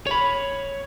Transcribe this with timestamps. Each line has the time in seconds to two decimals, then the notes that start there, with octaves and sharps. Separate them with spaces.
0.07 C#5 B5